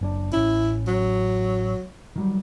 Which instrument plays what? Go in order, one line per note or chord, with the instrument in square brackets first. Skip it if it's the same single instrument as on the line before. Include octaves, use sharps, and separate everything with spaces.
[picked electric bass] F#1 C#4 D4
[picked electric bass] A1 C#4 [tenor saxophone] E4
[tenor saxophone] F#3
[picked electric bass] D#3 F#3 G3